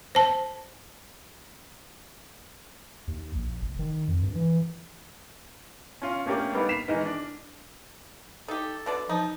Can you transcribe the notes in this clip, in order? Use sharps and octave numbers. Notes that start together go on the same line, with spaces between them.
C5 A5
D#2
A#1
F1
D#3
F2
G2
E3
C#4 F4
A3 A#3 C#4 D4 G4 A#4
G3 A#3 B3 D4 D#4
B6 C7 E7 F7
D#3 E3 G#3 D#4 A#4 D#5
D4
D#4 G4 A4
B2 D3 D5
F3 D#4